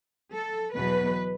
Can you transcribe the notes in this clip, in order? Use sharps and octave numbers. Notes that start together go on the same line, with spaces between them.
A4
E2 B2 F#3 B4